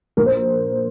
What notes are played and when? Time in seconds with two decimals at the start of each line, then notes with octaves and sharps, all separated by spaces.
0.17 A#1 A#4
0.26 C5